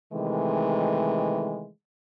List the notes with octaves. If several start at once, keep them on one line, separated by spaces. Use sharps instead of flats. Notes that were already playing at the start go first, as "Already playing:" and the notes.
C3 D#3 E3 G#3 A3